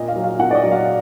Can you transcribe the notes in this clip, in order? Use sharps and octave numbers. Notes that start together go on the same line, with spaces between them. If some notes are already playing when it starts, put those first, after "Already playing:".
Already playing: A#2 D#5
F5
F#3
F5
A#2 F#5
D5
D#5
F#3
F5